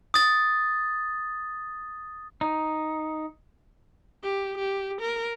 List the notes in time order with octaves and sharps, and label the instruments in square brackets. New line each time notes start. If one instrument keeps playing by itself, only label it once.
[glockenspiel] D#6 A6
[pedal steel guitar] D#4
[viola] G4
G4
A#4